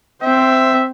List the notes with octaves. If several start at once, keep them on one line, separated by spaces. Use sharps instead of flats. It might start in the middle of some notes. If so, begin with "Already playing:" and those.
C4 C5 E5